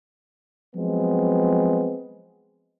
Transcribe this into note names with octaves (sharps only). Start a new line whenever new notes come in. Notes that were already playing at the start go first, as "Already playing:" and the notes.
F3 F#3 G#3 B3 C4